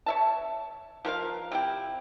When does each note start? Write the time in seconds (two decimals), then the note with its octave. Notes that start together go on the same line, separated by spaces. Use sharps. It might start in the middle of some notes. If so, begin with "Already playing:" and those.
0.06 C#5 E5 A5
1.05 F3 A#4 B4 F5
1.52 C3 E4 G5